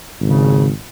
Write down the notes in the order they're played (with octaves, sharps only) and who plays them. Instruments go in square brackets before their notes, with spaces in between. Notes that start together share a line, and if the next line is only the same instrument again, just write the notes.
[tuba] G#1 [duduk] C#3